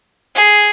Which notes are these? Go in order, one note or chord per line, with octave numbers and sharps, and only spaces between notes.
G#4